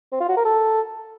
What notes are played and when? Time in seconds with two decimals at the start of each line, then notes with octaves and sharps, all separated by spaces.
0.12 C4
0.20 F4
0.28 F#4
0.37 A#4
0.45 A4